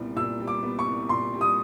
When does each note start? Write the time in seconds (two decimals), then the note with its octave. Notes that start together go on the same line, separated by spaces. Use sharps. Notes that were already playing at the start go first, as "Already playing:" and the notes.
Already playing: C2 A#2 G3 B3
0.16 A#2 E6
0.40 G3
0.47 D6
0.63 B3
0.79 C#6
0.86 C2
1.09 A#2 C6
1.34 G3
1.41 D#6